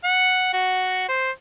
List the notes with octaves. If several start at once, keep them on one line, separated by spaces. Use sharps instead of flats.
F#5
F#4
C5